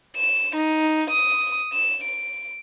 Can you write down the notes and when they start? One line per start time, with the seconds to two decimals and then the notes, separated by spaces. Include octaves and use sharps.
0.17 E7
0.56 D#4
1.10 D#6
1.73 E7
2.04 D7